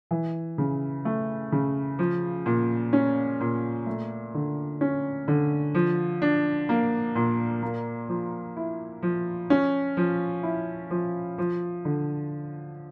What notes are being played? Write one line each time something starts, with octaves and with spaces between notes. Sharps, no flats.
E3
C#3
A3
C#3
F3
A#2
C#4
A#2
A3
D3
C#4
D3
F3
D4
A#3
A#2
A#3
F3
E4
F3
C#4
F3
E4
F3
F3
D3